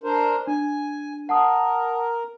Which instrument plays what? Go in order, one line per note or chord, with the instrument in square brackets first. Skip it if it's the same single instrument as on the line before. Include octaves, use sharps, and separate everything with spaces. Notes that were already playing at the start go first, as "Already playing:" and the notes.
[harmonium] D4 A#4 C5
[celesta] D4 [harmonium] G#5
[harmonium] A#4 [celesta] F#5 A5 D#6